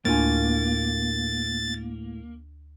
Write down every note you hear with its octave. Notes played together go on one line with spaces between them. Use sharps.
D2 A2 A#3 D4 F4 G#5 A6